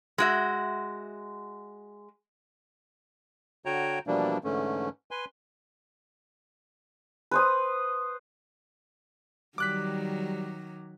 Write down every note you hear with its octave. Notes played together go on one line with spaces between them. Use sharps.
G#3 F#4 E5
D3 F#4 C#5 G5 A#5
B2 E3 F3 G3 A#3 D4
G#2 D3 E3 A3 C#4
B4 G#5 C6
B4 C5 D#6
D#3 F#3 G3 D6 F#6 B6